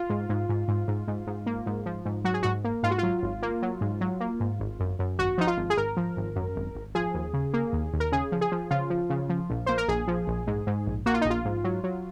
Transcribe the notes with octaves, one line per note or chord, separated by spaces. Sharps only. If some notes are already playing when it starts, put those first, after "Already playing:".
Already playing: F4
G#2
G#2
G#2
G#2
G#2
G#2
G#2
A#3
G#2
F3
G#2
F#3 F#4
G#4
G#2 F#4
A#3
G#2 F4
F#4
F#3 F4
G#1
A#3
F#3
G#2
F#3
A#3
G#2
G#1
F#2
F#2
G#1 F#4
F3 D#4
F4
G#1
G#4
G#1 A#4
F3
G#1
F#2
G#1
G#1
F3 G#4
D#2
C#3
A#3
D#2
D#2
A#4
C#3 G#4
F3
G#4
F3
C#3 F4
F3
C#3
F3
A#1
A#3 C5
A#4
A#1 G#4
F3
A#1
G#2
G#2
A#1
A#3 F#4
F4
D#4
A#1 F4
G#2
F#3
F#3